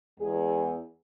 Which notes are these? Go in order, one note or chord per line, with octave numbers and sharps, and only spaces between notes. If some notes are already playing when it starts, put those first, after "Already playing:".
E2 G#3 G#4